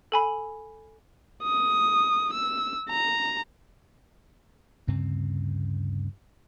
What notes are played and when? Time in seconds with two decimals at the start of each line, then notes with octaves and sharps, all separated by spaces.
0.12 A4 G#5 B5
1.44 D#6
2.33 E6
2.90 A#5
4.87 D2 G2 C#3 C4